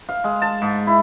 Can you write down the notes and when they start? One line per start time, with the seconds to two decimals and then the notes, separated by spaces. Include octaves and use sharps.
0.09 F5
0.24 G#3
0.42 A5
0.62 G#2
0.87 E4